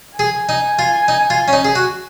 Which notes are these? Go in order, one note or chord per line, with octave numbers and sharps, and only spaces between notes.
G#4 G#5
D#4
F4
D#4
F4
C#4
D#4
G#4
F#4